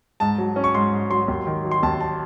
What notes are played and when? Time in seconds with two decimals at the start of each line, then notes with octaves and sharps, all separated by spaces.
0.20 G#2 A5
0.38 F#3
0.56 C#4
0.64 C#6
0.75 G#2 C6
0.93 G#2
1.10 F#3 C6
1.28 D#2
1.47 D#3
1.65 F#3
1.71 C6
1.83 D#2 A5
2.00 A5